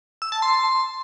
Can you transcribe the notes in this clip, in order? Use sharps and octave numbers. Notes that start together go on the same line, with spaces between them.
E6
A5
C6